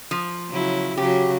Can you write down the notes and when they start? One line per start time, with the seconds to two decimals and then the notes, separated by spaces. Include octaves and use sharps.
0.11 F3
0.48 C#3 F#3 E4
0.97 C#3 F#3 F#4 G4